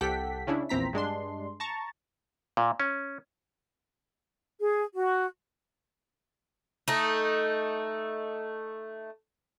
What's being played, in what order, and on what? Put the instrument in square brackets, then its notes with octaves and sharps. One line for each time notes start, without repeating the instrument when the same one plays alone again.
[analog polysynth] C2 G4 A4 F#5 G5 B6
C#3 C#4 D4 E4
A#1 E2 C4 A#5 B6
G2 G#3 D4 C6
A5 A#5 C#6 A6
[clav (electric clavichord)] A#2
C#4
[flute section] G#4
F#4
[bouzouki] A3 D#4